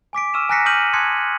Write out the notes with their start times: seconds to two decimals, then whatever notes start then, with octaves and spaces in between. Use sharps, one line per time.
0.13 G#5 D6 B6 D7
0.34 C#6 E6 F6 D#7 E7
0.49 G#5 A#5 F#6 A#6 B6 C#7
0.66 C#6 D#6 F6 G6 D#7 F#7
0.93 A5 C6 D#6 F#6 G#6 C#7